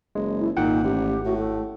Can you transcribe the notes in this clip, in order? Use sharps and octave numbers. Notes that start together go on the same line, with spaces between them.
F#1 G#3
E4
G#1 A#2 D#4 F#5 G5
A1 G4
A2 F#4
A3